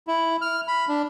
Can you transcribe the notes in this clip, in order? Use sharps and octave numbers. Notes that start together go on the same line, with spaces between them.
E4
F6
B5
D4